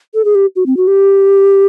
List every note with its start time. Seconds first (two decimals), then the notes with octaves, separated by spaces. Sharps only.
0.14 A4
0.25 G#4
0.35 G4
0.56 F#4
0.66 C4
0.77 F#4
0.87 G4